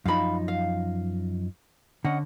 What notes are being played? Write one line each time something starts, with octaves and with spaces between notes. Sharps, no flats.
F#2 F3 D#4 F5 B5
F5
D3 C#4 D#5 F#5